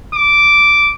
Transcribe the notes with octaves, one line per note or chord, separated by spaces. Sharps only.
D6